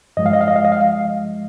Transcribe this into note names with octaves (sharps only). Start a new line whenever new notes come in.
G2 F3 G#3 D#5
F5
D#5
F5
D#5
F5
D#5
F5